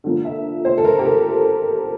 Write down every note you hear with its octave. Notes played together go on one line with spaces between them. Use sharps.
D3 F3 A#3
E5
C5
A4
A#4
G4
A4